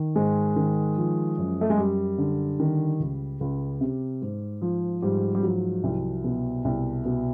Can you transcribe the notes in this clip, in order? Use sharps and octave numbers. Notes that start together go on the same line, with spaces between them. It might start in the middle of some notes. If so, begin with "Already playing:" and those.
Already playing: D#3
G#2 G#3
D#3
F3
F#2
A3
G#3
F#2 G3
D3
D#3
C#2
C#2
C3
G#2
F3
G#2 G3
G3
F3 F#3
C2
B2
C2
B2